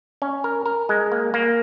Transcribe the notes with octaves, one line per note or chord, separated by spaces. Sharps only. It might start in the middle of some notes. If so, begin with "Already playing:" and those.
C#4
A#4
A#4
G#3
A#3
A#3